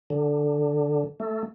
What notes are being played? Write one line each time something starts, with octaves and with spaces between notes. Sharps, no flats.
D3
A3